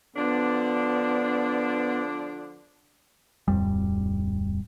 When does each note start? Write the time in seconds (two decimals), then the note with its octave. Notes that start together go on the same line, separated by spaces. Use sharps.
0.16 D3 F3 B3 D4
3.48 D1 A1 F2 G3